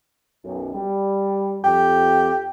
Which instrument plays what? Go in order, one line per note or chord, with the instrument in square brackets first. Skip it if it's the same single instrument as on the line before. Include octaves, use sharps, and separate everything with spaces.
[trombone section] B1 F#2
G3
[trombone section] F2 [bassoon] G4